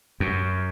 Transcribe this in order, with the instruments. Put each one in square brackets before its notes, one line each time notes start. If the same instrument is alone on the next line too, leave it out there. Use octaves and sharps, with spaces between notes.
[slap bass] F#2